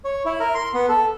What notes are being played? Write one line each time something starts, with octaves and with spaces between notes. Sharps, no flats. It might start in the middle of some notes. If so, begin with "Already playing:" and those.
C#5
E4
A#4
C6
B3
A4